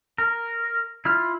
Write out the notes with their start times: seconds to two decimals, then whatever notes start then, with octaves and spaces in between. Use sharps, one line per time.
0.18 A#4
1.05 E4 F4 F6